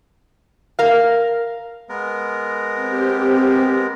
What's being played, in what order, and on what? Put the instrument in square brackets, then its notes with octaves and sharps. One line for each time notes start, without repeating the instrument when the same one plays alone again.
[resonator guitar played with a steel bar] A#4 F5
[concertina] G#3 B3 A#4
[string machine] C4 G4